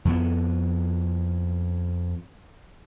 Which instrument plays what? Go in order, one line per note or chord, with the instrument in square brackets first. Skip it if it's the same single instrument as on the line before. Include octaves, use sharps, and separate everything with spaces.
[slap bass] F2 B3